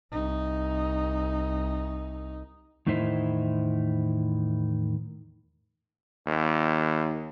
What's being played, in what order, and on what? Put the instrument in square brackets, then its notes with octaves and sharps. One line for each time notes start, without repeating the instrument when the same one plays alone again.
[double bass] C2 D#4
[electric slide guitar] E2 A2 D#3 D#4 E4 C5
[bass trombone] D#2